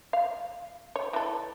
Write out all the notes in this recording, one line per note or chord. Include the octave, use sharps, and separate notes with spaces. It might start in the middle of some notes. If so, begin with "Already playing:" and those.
F5
C#5
E3 A4